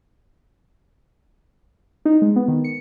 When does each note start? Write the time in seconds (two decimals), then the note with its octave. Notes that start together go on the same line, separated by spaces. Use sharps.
2.05 D#4
2.22 G#3
2.36 B3
2.48 D#3
2.64 C#7